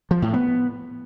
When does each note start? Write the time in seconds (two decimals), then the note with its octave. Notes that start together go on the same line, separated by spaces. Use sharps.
0.11 F3
0.22 A2
0.34 B3